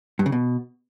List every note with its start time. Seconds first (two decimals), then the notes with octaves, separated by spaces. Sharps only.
0.19 G2
0.26 C#3
0.32 B2